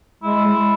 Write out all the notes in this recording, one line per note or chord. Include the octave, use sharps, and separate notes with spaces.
G#3 E4
G#3